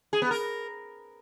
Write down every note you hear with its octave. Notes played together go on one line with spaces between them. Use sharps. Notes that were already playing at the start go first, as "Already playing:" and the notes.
G#4
B3
A#4